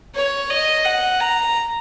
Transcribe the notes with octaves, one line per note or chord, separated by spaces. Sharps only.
C#5
D#5
F#5
A#5